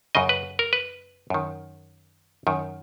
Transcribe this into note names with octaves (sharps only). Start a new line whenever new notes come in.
F#2 C#3 D#5
B4
A#4
B4
F#2 D#3
F#2 D#3